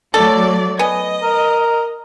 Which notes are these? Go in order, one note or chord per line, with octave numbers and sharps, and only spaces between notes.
F#3 A3 A4 D5
B3 D#5 G#5
A#4